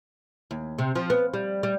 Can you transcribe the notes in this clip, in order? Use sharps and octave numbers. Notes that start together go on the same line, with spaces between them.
D#2
C3
F3
B3
G3
G3